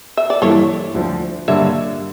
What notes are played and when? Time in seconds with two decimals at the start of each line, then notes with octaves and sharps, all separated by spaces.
0.17 E5
0.30 D5
0.42 G2 E3 G3 A#3 E4 A4 C#5
0.94 D2 D3 F3
1.48 G2 D3 G3 A#3 D4 C#5 E5